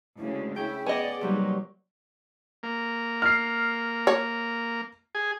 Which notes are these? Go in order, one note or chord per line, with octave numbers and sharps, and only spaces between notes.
D2 C#3 G#3 E4
C#4 E4 G#4 G5
B3 D5 D#5 G#5
C3 F#3 G3 A#3 D#4
A#3
F6 C7
C#5
G#4